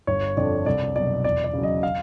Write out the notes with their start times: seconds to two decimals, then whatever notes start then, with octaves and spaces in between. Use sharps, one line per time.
0.07 G1 C#5
0.37 F2 D3 D5
0.66 C2 D5
0.95 B2 F#3 D5
1.24 E2 D5
1.44 D5
1.53 C#3 F#3
1.63 D#5
1.83 F5